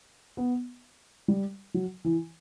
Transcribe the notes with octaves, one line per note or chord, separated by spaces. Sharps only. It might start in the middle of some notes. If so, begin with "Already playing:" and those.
B3
G3
F#3
E3